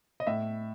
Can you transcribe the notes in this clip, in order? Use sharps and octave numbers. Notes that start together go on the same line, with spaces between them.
D#5
A2 E5